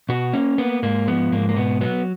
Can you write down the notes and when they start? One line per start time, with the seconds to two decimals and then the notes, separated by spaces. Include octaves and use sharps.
0.09 B2 F#4
0.33 A#3 C#4
0.58 A#3 B3
0.83 G#2 A#3
1.08 F3 B3
1.32 G#2 A#3
1.49 A#3
1.56 B2 B3
1.81 F#3 B3